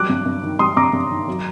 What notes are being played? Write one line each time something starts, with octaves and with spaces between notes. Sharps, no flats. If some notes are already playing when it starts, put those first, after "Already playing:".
Already playing: F#3 G3 D6 F#6
G2
G2
D#3
G3 C6 D#6
G2 A#5 D6
G2
D#3
F#3